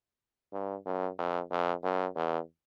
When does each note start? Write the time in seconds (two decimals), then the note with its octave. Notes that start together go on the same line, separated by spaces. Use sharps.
0.53 G2
0.86 F#2
1.18 F2
1.51 F2
1.84 F#2
2.16 E2